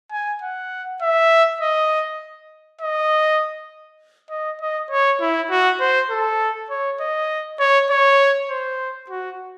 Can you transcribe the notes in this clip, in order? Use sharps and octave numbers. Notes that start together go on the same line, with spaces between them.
G#5
F#5
E5
D#5
D#5
D#5
D#5
C#5
E4
F#4
C5
A4
C#5
D#5
C#5
C#5
C5
F#4